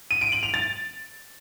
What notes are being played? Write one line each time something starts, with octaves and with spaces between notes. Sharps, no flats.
D#7
D7
F#7
F7
A6